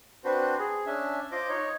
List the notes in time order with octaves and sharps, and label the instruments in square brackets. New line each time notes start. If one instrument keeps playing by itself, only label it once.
[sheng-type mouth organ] C4 D4 F#4 B4 C5
G#4
C#4 D4 E5
F4 C5 D#5 D6
D#4 C#5